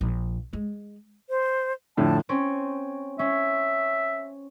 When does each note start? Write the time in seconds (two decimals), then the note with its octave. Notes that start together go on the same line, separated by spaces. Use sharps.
0.01 A#1
0.53 G#3
1.29 C5
1.97 F2 A2 D3 A5
2.29 C4 C#4
3.19 C#4 E5